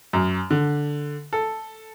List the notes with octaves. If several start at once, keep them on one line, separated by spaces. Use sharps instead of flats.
F#2
D3
A4